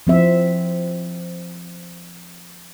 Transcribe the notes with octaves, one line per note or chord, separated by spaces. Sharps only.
F3 C4 E5